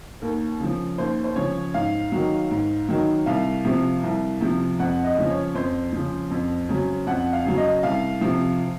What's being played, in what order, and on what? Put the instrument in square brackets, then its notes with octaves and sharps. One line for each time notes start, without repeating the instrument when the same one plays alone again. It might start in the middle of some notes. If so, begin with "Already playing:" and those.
[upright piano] D#2 A#4
C#3 F3
D#2 C5
C5
C#3 F3 C#5
G#2 F5
D#3 F#3
G#2
D#3 F#3
C2 F5
C3 F3
C2
C3 F3
F2 F#5
D#5
C#3 F3
C#5
F2 C5
C#3 F3
F2
C#3 F#3
F2 F#5
F5
C#3 F#3
D#5
C2 F5
C3 F3